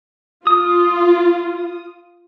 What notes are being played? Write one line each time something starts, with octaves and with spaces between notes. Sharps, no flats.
F4 D#6